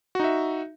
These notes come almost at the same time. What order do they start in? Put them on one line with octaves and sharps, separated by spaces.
F#4 D#4 E5